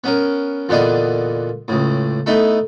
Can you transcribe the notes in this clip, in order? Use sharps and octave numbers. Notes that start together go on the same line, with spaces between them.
B3 C#4 A#4
E2 A#2 D3 B3 D5 D#5
C#2 A2
A3 B3 D#4 E4 A4